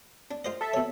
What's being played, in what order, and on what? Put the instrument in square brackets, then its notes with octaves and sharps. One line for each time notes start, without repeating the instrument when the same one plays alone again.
[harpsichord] D4
F4 C5 D#5
[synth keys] A4 E5
[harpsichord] B2 C#5